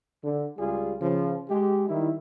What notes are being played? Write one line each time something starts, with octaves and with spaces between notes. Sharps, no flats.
D3
C#2 G3 F4 G#4
C#3 F3
G#3 G4
D#3 G3 E4